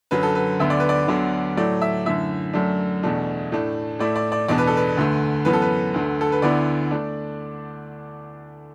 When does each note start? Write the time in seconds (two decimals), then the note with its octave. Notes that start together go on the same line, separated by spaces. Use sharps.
0.11 F#2 D3 F#3 B4
0.23 A4
0.35 B4
0.59 D2 D3 B3 E5
0.70 D5
0.80 B4
0.89 D5
1.08 D2 D3 F#3 B3 D4
1.57 A2 F#3 A3 D5
1.82 E5
2.06 F#2 D3 A3 E4 E5
2.54 F#2 F#3 A3 D4
3.03 E2 B2 A3 D4
3.52 A2 A3 D4
3.99 A2 A3 E4 D5
4.16 D5
4.32 D5
4.48 E2 B2 B3 D4 D5
4.58 B4
4.67 A4
4.77 B4
4.97 D2 D3 A3
5.45 F#2 E3 B3 B4
5.53 A4
5.62 B4
5.94 D2 D3 A3
6.21 A4
6.32 B4
6.42 D2 D3 B3 E4 D5
6.91 A3 D4